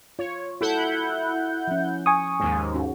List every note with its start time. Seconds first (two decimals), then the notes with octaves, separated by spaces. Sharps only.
0.19 F4 C#5
0.61 E4 F#4 A4 F#5 G6
1.67 F3 C#4
2.06 G#5 C#6 D#6
2.40 D#2 G#2
2.75 C#4 F#4